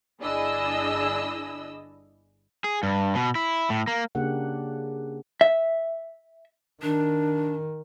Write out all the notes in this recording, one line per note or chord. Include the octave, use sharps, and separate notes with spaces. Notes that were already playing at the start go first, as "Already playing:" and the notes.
G1 D4 E4 G#4 D#5 E6
G#4
G2
B2
E4
A2
A#3
C#3 A#3 D4 G4 F#5
E5
D#3 D4